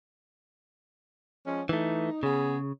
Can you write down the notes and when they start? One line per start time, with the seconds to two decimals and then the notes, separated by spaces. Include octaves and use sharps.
1.46 F3 G#3 C#4
1.69 E3 A3 D#4
2.23 C#3 B3 C#4 G#4